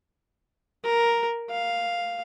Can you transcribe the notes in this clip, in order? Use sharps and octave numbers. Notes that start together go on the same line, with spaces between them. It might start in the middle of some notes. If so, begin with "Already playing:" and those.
A#4
F5